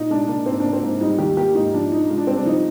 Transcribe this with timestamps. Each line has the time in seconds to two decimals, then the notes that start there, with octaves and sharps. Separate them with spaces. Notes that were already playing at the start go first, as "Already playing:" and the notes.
Already playing: A#2 D#4
0.10 G#3 D4
0.28 A#3 D4
0.46 G#2 C4
0.60 A#3 D4
0.73 C4
0.83 G#2
1.01 G3 D#4
1.18 D#2 G4
1.37 A#3 G4
1.55 G#2 D#4
1.74 F3 D4
1.92 G#3 D#4
2.09 G#3 F4
2.18 D4
2.27 G2 C4
2.36 D4
2.45 F3 D#4